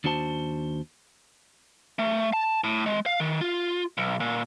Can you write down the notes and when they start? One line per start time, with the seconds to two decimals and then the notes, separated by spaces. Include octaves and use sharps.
0.04 D#2 D4 F#4 C5 A5
1.99 A3
2.33 A5
2.64 A2
2.86 G#3
3.06 F5
3.20 D#3
3.41 F4
3.98 B1
4.20 A#2